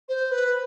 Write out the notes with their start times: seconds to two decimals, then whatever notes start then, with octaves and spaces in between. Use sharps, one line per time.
0.09 C5
0.31 B4